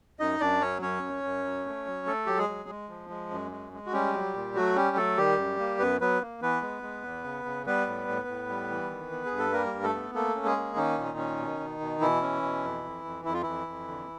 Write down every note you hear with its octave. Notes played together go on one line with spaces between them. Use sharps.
F#2 D#4 D#5
F#2 D4 D5
F#3 C#4 C#5
F#2 C#4 C#5
F#2
F#2
F#3
A3
F#3
A3 A4
F#3 G4
G#3 G#4
F#3
G#3
F3
G#3
F#2
G#3
G#3
F#4
G3 C#4 G4
F#3
A#2
F#3 A3 F#4
G3 C#4 G4
F#3 A3 A4
D#3 G3 G4
F#2
A#3
F#2 B3 B4
F#3 B3 B4
A#3
E3 B3 B4
G#3
G#3
E2
C#3
C#3
G3 B3 B4
A2
A2
A2
G3
E3
D#3
B3
G#4
G2
A4
G3 A#3 A#4
G2
A3 A4
B3
A3 A#3 A4
C#4
G#3 G#4
A#3
D#3 C#4 D#4
A#2
C#4
B2
B2
B2
B2 E3 E4
C#4
B2
F2
F2
F2
F2 E4
F4
F2 E3 E4
F2
D3